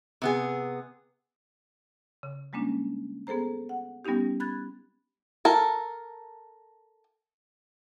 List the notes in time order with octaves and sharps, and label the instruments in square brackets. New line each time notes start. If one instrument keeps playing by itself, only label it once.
[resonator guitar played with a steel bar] C3 B3 G#4
[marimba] C#3
G3 G#3 A#3 C#4 D4
B3 G#4 A4 C5 A#5
F#5
G3 B3 C#4 D#4 G4
B5 F#6 G#6 A6
[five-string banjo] A4 A#4